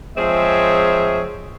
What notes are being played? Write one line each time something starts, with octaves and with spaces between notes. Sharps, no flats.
F3 G#3 C4 G#4 C#5 E5